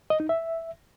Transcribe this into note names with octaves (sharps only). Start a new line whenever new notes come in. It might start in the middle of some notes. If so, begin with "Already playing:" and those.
D#5
D#4
E5